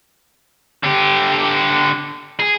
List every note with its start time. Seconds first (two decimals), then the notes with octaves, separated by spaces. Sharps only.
0.83 D3 G4
2.40 G#4